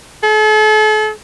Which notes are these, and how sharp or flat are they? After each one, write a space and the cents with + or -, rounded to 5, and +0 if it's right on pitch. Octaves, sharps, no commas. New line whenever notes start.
A4 -40